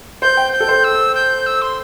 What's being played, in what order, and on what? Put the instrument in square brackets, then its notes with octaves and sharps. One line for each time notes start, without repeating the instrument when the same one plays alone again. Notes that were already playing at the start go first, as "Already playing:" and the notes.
[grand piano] C5 [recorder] G6
[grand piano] G5
[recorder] G6
[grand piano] A4
C5
[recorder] E6
G6
E6
C6